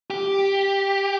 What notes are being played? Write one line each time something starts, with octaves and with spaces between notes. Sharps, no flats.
G4